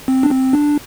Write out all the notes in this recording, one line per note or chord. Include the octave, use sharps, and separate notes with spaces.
C4
D4
C4
D4